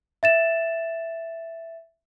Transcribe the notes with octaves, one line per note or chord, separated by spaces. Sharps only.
E5 A6 E7